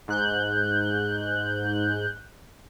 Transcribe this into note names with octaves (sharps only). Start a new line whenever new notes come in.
G#2 F#6 G6